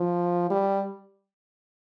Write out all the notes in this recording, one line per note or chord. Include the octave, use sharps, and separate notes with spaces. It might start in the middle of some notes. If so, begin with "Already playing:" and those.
Already playing: F3
G3